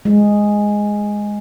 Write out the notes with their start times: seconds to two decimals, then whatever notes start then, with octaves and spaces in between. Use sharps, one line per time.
0.05 G#3